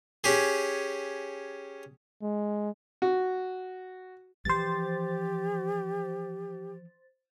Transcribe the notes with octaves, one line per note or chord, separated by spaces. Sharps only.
C#4 G4 G#4
G#3
F#4
E3 F3 G4 C5 A6